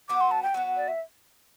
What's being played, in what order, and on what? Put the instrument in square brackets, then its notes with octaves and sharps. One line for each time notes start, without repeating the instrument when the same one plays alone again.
[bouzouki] F#3 B3 F#4 [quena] D6
[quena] C6
A5
G5
[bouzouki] F#3 B3 F#4 [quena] F#5
[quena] D5
E5